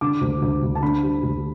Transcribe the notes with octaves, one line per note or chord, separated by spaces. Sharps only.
D3 D6
D2
D2
D2
A5
D3 B5
G3
D2